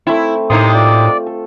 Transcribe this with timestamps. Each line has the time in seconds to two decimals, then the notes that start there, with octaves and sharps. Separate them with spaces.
0.07 A3 C4 E4
0.50 A2 C3 A#3 D#4 C6 D#6
0.74 F4 D5
1.27 A4